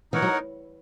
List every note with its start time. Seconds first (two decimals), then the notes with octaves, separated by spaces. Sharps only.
0.12 E3 D#4 A#4 C#5 F#5
0.22 F#3